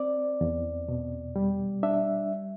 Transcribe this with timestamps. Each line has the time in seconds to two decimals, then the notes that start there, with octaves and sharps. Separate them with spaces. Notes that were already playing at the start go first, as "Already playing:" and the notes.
Already playing: C4 D5
0.41 E2
0.88 B2
1.36 G3
1.83 D4 E5